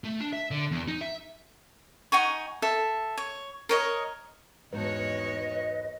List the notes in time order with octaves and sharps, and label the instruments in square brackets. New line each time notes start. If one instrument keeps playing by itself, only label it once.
[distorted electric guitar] A3
D4
E5
D3
E2
D#4
E5
[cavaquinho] D#4 F#5 G#5 C#6
A4 E5
C#5
A#4 C#5 D#5
[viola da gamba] E2 F#4 C#5 [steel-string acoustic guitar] G#2 D#4 A5 [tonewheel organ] B4 [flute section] D#5